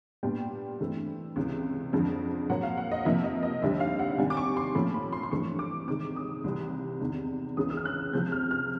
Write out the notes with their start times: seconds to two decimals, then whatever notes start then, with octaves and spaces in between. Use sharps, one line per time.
0.23 A#2 G3 B3 D4 G5
0.80 G2 E3 A3 C4
1.36 C#2 C3 E3
1.93 F2 D3 F3 G#3
2.49 A#2 F#3 A#3 F#5
2.63 F5
2.78 F#5
2.91 D#5
3.05 C3 F3 A#3 E5
3.24 D#5
3.43 D#5
3.62 D#2 D3 G3 C4 E5
3.80 F5
3.99 F#5
4.18 C3 D#3 G3 G#5
4.30 D6
4.37 C#6
4.57 C6
4.75 A#2 F3 A3 C#4 B5
4.94 B5
5.12 C6
5.23 C6
5.31 G2 E3 A3 C4 C#6
5.59 D6
5.87 C3 D#3 G#3 D6
6.16 D#6
6.44 C2 C3 E3 G3
7.01 E2 C3 D#3
7.57 C#2 C#3 E3 G#3 B3 D#6
7.70 E6
7.77 F6
7.85 F#6
8.13 C3 F3 G#3 C4 G6
8.32 F6
8.51 F6